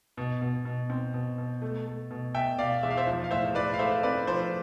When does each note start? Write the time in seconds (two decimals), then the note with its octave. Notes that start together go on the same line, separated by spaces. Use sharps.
0.17 B2
0.42 B2
0.65 B2
0.90 C4
1.14 B2
1.38 B2
1.62 A3
1.86 A3
2.11 B2
2.34 B2 E5 G5
2.59 B2 D5 F5
2.83 E2 E5
2.90 F5
2.97 C5 E5
3.07 F3
3.24 F5
3.31 A2 C5 E5
3.55 A2 B4 D5
3.74 F5
3.79 A3 C5 E5
4.03 C4 B4 D5
4.27 F3 C5